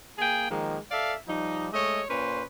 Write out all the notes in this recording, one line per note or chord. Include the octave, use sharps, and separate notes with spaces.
A#3 G#4 G5 G#5
D#3 F3 G#3 A#3
A4 D5 E5 F5
F3 G3 D#4
G#3 A3 C#5 D#5
A#2 C#4 B4 C5